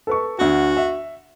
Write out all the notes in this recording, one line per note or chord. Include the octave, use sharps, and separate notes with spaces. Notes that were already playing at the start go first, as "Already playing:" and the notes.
A4 B4 C#6
D2 F#4 F#5
E5